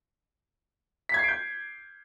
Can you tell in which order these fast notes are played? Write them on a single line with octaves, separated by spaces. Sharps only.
B6 G#6 C7 D7 G6